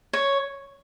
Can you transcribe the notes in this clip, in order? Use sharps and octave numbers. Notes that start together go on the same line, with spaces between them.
C#5